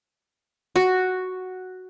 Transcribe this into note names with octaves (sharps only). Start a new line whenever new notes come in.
F#4